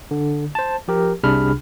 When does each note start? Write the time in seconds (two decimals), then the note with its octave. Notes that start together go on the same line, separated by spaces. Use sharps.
0.11 D3
0.55 C5 A5
0.88 F3 G4 A#4
1.23 C2 C3 D4 G#4 B5 F6